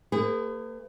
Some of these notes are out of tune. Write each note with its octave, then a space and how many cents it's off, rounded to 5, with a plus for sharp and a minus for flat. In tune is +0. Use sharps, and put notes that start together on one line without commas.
A#3 -40 G#4 -20 B4 +40